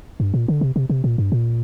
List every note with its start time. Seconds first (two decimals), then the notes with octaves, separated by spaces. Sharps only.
0.20 G2
0.34 A#2
0.48 D3
0.61 C3
0.76 C3
0.90 C3
1.04 A#2
1.18 G2
1.32 A#2